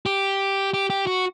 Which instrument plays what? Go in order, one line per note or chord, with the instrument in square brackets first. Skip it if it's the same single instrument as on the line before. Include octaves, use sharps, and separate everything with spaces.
[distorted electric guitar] G4
G4
G4
F#4